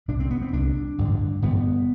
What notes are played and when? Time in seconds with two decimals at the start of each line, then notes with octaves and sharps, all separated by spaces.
0.08 C2 C3 D4
0.20 C4
0.31 B3
0.42 C4
0.53 C2 C3 D4
0.98 A1 G2 D3
1.42 A1 G2 D3 B3